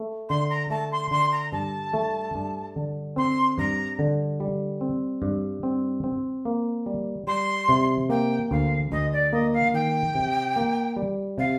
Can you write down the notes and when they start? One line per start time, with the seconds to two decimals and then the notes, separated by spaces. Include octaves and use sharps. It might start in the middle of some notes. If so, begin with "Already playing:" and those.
Already playing: A3
0.29 D3 C6
0.49 A#5
0.70 A3 A5
0.92 C6
1.11 D3 C6
1.32 A#5
1.52 G2 A5
1.94 A3
2.35 G2
2.76 D3
3.16 C4 C6
3.58 G2 A#5
3.99 D3
4.40 G3
4.81 C4
5.22 G2
5.63 C4
6.04 C4
6.45 A#3
6.86 G3
7.27 G3 C6
7.69 C3
8.10 A#3 G5
8.51 D2 F5
8.91 D2 D#5
9.12 D5
9.32 A#3 D#5
9.53 F5
9.74 D#3 G5
10.15 C3
10.56 A#3
10.97 G3
11.38 C3 F5